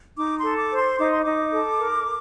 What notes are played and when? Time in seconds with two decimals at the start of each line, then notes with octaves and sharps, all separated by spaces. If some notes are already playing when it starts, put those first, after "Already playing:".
0.17 D#4 D6
0.38 C6
0.45 A4
0.58 D6
0.71 C5
0.78 C6
0.99 D#4 D6
1.11 C6
1.23 D#4 D6
1.52 A4
1.79 A#4